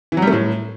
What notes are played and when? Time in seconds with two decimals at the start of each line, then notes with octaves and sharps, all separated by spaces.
0.12 E3
0.17 F#3
0.22 G3
0.27 A3
0.32 A2